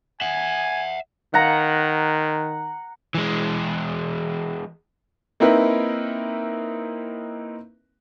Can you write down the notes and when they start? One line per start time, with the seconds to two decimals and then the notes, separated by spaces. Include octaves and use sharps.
0.22 E5 F#5 G#5
1.34 D#3 F#5 A#5
3.15 E3 G#3
5.40 A#3 C4 D#4 E4 A#4 B4